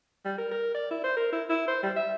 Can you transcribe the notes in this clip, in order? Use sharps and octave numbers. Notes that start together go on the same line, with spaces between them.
G3
A#4
A#4
D5
E4
C5
A#4
E4
E4
C5
G3
E5